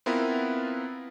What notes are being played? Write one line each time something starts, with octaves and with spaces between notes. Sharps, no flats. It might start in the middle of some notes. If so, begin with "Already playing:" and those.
B3 C4 E4 F4 A#4 B4